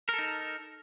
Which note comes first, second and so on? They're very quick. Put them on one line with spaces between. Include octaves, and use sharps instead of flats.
A#4 A4 D#4